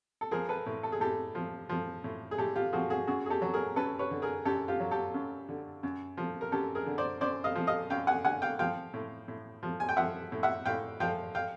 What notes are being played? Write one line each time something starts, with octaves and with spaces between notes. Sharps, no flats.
A4
F3 G#4 A#4
A4 B4
A2
A4
G#4
A2 G4 A4
F3
F3
A2
G#4
A2 G4 A4
F4 G4
F3 F#4 G#4
F#4 G#4
F#2 F#4 G#4
G#4
G4 A4
F#3
G#4 A#4
F#2 A4 B4
B4 C#5
D3
G#4 A#4
F#2 G4 A4
F4 G4
F#3
G4 A4
F#2
D3
F#2
F3
A#4
F#2 G4 A4
G#4 A#4
D3
C5 D5
F#2 C5 D5
D#5 F5
F3
D#5 F5
F#2 F5 G5
F#5 G#5
D3 F#5 G#5
F5 G5
F3 F5 G5
A2
A2
F3
G#5
G5
F3 E5 F#5
A2
E5 F#5
A2 F5 G5
F3 F5 G5
F5 G5